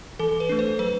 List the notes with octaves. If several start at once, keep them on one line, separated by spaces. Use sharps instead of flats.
E3 A4
B4
A3 D4
C5
F#3 B4